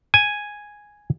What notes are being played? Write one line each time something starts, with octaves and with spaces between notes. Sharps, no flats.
G#5